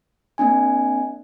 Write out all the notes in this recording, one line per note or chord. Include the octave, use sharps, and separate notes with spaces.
A#3 C4 D4 G#5